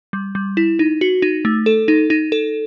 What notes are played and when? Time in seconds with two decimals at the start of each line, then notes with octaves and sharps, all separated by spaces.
0.13 G3
0.35 G3
0.57 E4
0.79 D#4
1.01 F#4
1.22 D#4
1.45 A3
1.66 A4
1.88 D#4
2.10 D#4
2.32 A4